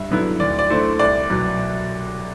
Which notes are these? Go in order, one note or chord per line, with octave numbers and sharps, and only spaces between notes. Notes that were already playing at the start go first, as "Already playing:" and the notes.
Already playing: G2 E5
D3 F#3 B3 E4
D2 D5
D5
D3 A3 E4 C5
C2 D5
B2 F#3